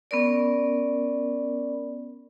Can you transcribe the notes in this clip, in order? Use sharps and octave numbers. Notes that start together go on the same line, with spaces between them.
B3 C#4 A#4 D5